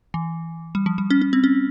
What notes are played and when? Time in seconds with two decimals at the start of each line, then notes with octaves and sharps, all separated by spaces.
0.14 E3
0.75 G3
0.86 F3
0.98 G3
1.10 C#4
1.22 C#4
1.33 C4
1.44 C#4